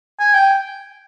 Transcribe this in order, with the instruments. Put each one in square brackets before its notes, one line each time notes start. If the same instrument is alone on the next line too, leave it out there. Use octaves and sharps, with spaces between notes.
[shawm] G#5
G5